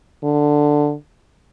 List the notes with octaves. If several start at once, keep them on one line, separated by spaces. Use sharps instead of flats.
D3